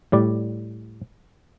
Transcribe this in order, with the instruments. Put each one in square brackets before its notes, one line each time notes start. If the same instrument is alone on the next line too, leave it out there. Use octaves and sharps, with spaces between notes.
[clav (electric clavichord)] A2 G3 D5